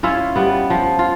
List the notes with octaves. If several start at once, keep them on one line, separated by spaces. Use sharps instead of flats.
C#4 E4 F4 E5
G3 B3
F3
F4